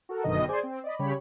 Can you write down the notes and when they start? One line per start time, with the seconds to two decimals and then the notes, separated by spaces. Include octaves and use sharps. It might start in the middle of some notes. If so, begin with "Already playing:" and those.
0.09 F#4 A4 A#4
0.24 G1 F#2 B2 D3 D#3 D#5
0.48 G#4 C5 D5 G#5 C6
0.63 C4
0.84 D5 D#5 B5
0.99 C#3 G3 G4 C#5 B5